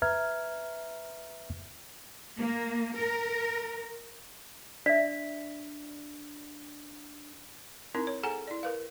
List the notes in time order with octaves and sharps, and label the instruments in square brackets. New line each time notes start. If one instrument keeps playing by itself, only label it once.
[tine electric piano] B4 E5 A#5 F6 G#6
[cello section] A#3
A#4
[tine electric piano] D4 [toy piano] D5 E5 [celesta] B6
[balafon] C4 D#4 E4 A#4
C#5
G#4 A4 F#5 G#5 A#5
E4 D5
A#4 B4 F5